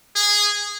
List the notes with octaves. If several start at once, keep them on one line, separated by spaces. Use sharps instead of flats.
G#4